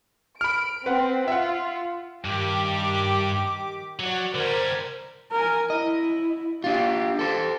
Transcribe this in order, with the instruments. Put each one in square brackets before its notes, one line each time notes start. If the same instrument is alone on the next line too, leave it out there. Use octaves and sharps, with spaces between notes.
[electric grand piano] B5 F6 [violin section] D7
[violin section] C4 [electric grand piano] B4 F#5
[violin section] F4 [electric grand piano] E5 F#5
[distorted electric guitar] G2 [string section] D#3 G4 D6
[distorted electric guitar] F#3 [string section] F#4 D5
[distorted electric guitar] D3 G3 [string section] A#4 C5 G#6
[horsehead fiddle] A#4 G#5
[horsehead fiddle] E4 [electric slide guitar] D#5
[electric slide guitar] D4 F4 [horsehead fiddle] G4
[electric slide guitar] A4 C5